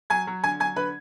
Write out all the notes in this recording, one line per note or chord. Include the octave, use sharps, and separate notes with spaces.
F#3 G#5 G#6
F#3
D3 G#5 G#6
F#3 G#5 G#6
D3 B4 B5